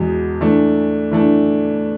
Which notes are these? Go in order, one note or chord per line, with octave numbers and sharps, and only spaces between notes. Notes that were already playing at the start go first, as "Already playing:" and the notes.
Already playing: E2 B2 G#3
E3 A3 D4
E3 A3 D4